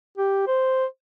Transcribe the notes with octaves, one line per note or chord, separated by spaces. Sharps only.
G4
C5